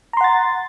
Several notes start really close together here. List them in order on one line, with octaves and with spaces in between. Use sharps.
A#5 C6 F#5 A6